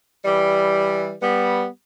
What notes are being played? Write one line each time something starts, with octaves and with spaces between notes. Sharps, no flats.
E3 G3
G3 B3